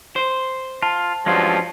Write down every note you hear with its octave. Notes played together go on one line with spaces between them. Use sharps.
C5
F4 A5
G2 F3 F#3 G#3 C#4 F4